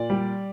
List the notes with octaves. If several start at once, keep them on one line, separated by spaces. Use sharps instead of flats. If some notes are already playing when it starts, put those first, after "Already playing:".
Already playing: A#2 D5
G3